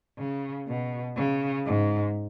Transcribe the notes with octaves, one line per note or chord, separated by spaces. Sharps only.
C#3
B2
C#3
G#2